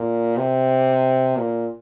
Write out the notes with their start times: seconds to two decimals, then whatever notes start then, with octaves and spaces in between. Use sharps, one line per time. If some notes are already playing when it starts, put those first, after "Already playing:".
Already playing: A#2
0.37 C3
1.37 A#2